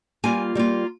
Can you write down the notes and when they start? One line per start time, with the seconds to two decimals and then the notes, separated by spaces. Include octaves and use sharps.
0.24 G3 A#3 F4 G#5
0.55 G3 A#3 F4